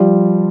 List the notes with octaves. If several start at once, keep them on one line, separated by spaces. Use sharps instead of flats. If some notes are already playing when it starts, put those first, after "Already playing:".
Already playing: F3 G3